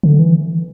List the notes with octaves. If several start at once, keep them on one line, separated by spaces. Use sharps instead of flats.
D3
E3